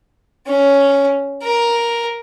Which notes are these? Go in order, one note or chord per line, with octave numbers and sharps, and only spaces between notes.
C#4
A#4